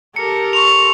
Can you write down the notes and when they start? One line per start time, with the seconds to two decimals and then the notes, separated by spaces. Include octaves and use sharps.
0.16 G4 A4 A#4 C#7
0.53 C6 C#6 F7